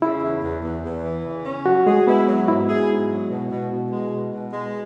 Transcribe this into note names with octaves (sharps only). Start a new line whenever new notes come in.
C#3 E4
E2
E2
E2
E2
E3
C#3
C#4
F#3 F#4
G#3 G#4
B3 E4
F#3
G#2 E4
G#4
G#2
F#3
B2
B2
B2
G#3
B2
B2
G#3